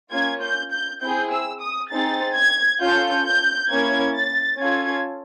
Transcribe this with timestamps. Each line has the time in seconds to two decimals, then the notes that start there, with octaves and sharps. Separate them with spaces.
0.11 A#3 C#4 F4 G#6
0.42 G6
0.71 G6
1.01 C4 E4 G#4 G6
1.31 E6
1.61 D#6
1.90 C4 D#4 G#4 A6
2.36 G#6
2.81 C#4 F4 A4 G6
3.26 G6
3.70 A#3 C#4 E4 G#6
4.15 A6
4.60 C#4 F4 A4 G#6